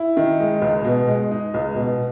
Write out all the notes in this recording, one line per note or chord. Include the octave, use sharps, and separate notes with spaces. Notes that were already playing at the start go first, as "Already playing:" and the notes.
Already playing: E4
D#3
G#3
C#2
B2
G#3
D#4
C#2
B2